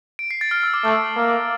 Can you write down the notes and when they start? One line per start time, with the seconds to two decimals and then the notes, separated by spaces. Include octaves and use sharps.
0.19 D7
0.31 C7
0.41 A6
0.51 F6
0.63 E6
0.74 D6
0.84 A3 E6
1.17 A#3